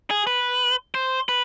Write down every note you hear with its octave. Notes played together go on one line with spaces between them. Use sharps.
G#4
B4
C5
B4